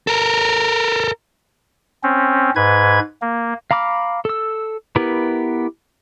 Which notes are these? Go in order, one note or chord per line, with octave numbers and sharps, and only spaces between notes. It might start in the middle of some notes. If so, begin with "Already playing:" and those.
A4 A#4
C4 C#4
G#2 B4 G#6
A#3
F5 A#5 B5 D6 F6
A4 E6
B3 E4 G4 A#4 B4